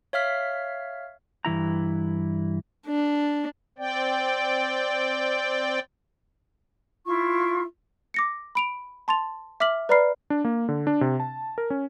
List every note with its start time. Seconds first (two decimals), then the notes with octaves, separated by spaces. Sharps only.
0.13 C#5 E5 F5 F6 B6
1.45 G2 E3 E4 A#5
2.86 D4
3.78 C4 D5 G5
7.05 E4 F4 C#6
8.14 D6 A#6 C#7
8.55 B5 D7 F7
9.08 A5 C6 A6 F7
9.60 E5 D6 F6 B6 F#7
9.89 B4 D5 A#5 B5 F6 C7
10.30 D4
10.44 A#3
10.69 D3
10.87 D4
11.01 C3
11.20 A5
11.58 A#4
11.70 C#4